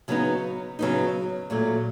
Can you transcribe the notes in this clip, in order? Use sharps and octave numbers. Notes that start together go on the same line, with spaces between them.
C#3 F#3 B3 D#4
C#3 F#3 B3 D#4
A#2 F#3 A3